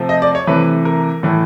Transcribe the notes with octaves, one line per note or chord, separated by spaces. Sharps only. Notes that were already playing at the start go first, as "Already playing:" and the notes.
Already playing: C3 F3 A3 C4
D#5
D5
C#5
C3 E3 A3 B4
A#4
A2 E3 A3